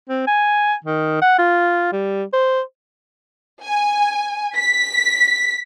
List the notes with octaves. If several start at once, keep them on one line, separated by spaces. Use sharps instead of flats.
C4
G#5
D#3
F#5
F4
G3
C5
G#5
B6